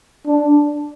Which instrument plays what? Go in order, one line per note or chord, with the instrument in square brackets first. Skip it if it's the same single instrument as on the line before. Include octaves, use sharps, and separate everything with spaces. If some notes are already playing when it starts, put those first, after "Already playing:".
[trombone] D4